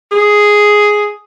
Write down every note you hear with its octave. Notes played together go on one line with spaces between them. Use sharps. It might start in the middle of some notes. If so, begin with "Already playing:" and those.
G#4